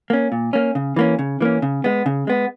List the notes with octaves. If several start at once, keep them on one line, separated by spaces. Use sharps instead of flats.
A#3 C#4
A#2
A#3 C#4
C#3
E3 A#3 C#4
C#3
E3 A#3 C#4
C#3
G#3 B3
C#3
G#3 B3